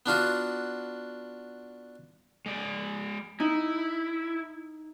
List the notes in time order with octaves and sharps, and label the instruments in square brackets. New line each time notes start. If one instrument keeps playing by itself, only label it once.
[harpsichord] B3 D4 F4 F#4
[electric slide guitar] G#3 D5
[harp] D#4 [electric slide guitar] E4